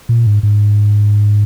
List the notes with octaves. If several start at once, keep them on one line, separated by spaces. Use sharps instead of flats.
A#2
G#2
G#2